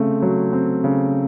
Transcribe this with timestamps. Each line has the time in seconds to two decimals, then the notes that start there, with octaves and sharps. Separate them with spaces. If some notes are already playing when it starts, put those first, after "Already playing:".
Already playing: C#3 A3 C4
0.22 F#3
0.53 C4
0.84 C#3